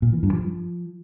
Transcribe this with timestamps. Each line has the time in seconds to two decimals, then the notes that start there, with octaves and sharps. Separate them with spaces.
0.02 A#2
0.13 E3
0.23 G2
0.33 F3